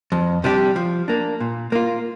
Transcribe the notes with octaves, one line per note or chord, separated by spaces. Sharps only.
F2
C3 G3 D4 G4
F3
A#3 D4
A#2
A#3 F4